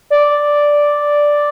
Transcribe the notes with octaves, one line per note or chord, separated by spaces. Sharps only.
D5